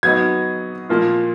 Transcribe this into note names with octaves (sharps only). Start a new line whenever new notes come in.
F#3 B3 D#4 G#6
A#2 F3 A#3 F4